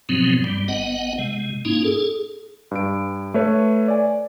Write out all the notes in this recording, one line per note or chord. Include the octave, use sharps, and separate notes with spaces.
G#2 B2 F3 F#3 B3 C4
G2 G3
G#1 B3 D#5 F#5
C3 G#3
G#2 A#3 C#4 D#4 E4
G#4 A4
G2 D7
A3 B4 C#5
D5 G#5